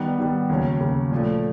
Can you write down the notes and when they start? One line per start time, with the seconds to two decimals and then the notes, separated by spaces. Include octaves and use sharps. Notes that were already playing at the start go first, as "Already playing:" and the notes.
Already playing: D#3 G3 B3
0.18 D#3 G3 B3
0.49 D#2 C#3 F#3
0.80 D#2 C#3 F#3
1.11 A#2 F3 A3